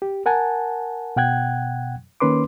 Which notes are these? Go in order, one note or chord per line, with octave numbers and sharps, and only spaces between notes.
G4
A#4 F#5 G#5 A5
B2 F#5 G5 F#6 G#6
D#3 A#3 C#4 B4 C6 D6